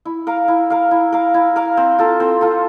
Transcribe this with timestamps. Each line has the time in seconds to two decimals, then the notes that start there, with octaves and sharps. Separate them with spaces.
0.05 E4
0.27 A#4 F5
0.48 E4
0.70 A#4 F5
0.91 E4
1.12 A#4 F5
1.34 E4
1.56 A#4 F5
1.77 C4
1.98 F4 A4
2.20 C4
2.41 F4 A4